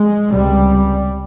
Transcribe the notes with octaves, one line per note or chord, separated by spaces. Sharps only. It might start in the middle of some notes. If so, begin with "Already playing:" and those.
Already playing: G#3
C#2 C3 G3